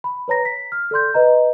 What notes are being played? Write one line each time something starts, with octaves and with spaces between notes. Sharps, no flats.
B5
B4 C#5 A#5 A#6
B6
F6
A4 D5 C6 G6
B4 D#5 A#5